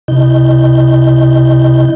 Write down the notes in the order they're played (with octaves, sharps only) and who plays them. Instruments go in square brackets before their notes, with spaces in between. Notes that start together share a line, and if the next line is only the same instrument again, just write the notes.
[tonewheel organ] C3 E4 D#5 G6